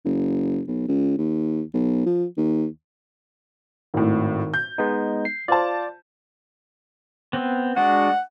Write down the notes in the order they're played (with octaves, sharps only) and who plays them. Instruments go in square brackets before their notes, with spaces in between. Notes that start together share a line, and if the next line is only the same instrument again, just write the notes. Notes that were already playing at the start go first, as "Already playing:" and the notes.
[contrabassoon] F#1
B1
C#2
D#2
B1
F3
D#2
[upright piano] G#1 A2 [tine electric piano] D#3
[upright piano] G6
[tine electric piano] G#3 B3 D#4
C7
[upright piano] F4 C5 A5 [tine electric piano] D5
[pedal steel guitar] B3 C4
[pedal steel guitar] G#3 D4 F#4 [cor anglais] F#5